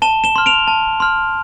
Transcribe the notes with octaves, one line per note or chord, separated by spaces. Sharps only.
A5 E7 G7
E7 G7
C6 F6
D7 F7
A5
C6 F6